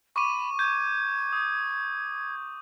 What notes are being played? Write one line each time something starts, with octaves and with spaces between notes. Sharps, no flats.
B5 C#6 D6 D#7
G6 G#6
D#6